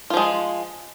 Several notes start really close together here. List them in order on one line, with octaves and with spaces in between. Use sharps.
F4 F3 G#3